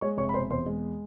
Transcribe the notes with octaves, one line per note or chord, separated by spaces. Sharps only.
G#3 C#5 C#6
F1 C#5 C#6
B5
B2 C5 C6
E2 C5 C6
G#3